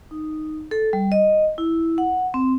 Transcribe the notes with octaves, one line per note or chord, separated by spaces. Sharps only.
D#4
A4
G3
D#5
E4
F#5
C4